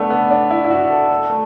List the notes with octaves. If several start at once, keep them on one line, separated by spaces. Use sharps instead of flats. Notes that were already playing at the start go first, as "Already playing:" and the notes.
Already playing: A3 B3 D4
B3
D4
E4
E4
F#4
A4
A4
A3